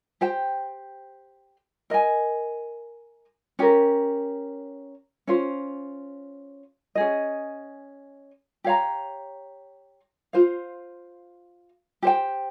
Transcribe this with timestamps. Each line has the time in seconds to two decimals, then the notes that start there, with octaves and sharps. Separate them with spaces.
0.21 G4 C5 G5
1.90 A#4 D#5 G#5
3.59 C#4 G4 A#4
5.27 C#4 F4 C5
6.95 C#4 G#4 D#5
8.64 G4 C#5 F5 A#5
10.33 F4 C5 F5
12.03 G4 C5 G5